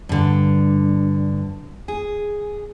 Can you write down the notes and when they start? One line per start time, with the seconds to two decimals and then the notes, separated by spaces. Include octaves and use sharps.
0.09 G2 D3
1.88 G#4